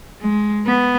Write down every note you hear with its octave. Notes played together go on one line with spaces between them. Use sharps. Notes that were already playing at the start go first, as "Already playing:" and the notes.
G#3
B3